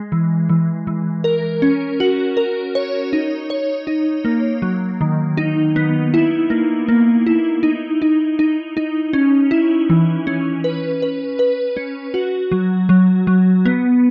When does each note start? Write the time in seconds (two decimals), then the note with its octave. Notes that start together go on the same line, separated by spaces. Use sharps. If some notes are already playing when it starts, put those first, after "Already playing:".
Already playing: G#3
0.12 E3
0.49 E3
0.87 E3
1.24 A#4
1.62 C#4
2.00 F#4
2.37 A#4
2.75 C#5
3.13 D#4
3.50 C#5
3.87 D#4
4.25 A#3
4.62 F#3
5.01 D#3
5.37 D#4
5.76 B3
6.14 E4
6.50 A#3
6.89 A#3
7.26 E4
7.63 D#4
8.02 D#4
8.39 D#4
8.77 D#4
9.13 C#4
9.51 E4
9.90 E3
10.27 C#4
10.64 B4
11.02 B4
11.39 B4
11.77 C#4
12.14 F#4
12.52 F#3
12.89 F#3
13.27 F#3
13.65 B3